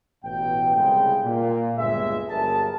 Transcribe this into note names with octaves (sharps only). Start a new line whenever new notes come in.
A1 B2 G5
C2 C#3 G#3 G5
A#2
G1 C#2 G#3 E5
G1 F#3 G#4 A#4 A5